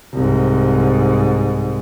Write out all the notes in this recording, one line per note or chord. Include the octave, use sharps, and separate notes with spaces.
C2 G#2